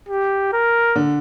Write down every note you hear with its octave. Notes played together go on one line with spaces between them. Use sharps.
G4
A#4
D3